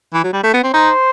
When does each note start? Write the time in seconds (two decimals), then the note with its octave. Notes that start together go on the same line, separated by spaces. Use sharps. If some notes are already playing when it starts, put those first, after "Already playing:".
0.14 E3
0.24 F#3
0.33 G3
0.44 A3
0.54 B3
0.64 C4
0.74 D#4 C5